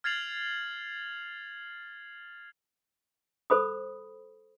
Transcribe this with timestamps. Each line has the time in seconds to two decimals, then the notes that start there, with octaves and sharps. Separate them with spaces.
0.04 F6 G#6 A6 C7 F7 F#7
3.50 A4 C5 B5 D#6